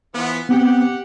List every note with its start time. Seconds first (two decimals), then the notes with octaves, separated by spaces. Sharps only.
0.13 E3 F3 B3
0.49 B3 C4 G4 F#5